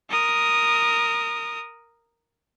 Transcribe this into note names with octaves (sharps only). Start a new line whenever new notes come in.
A#4 D#6